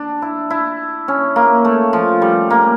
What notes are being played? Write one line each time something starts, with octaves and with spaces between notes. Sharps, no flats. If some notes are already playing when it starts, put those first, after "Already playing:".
Already playing: D4
E4
E4
C#4
A#3
A3
F3
G3
A#3